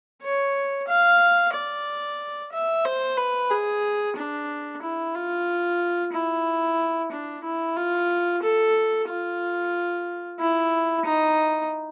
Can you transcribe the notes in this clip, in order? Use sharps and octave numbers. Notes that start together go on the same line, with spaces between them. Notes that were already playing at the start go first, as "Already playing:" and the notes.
C#5
F5
D5
E5
C5
B4
G#4
D4
E4
F4
E4
D4
E4
F4
A4
F4
E4
D#4